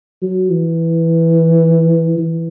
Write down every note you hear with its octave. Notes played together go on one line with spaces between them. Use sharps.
F#3
E3
E3